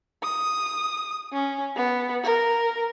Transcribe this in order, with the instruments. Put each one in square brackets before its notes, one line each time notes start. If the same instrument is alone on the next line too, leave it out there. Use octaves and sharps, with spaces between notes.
[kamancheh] D#6
C#4
B3
A#4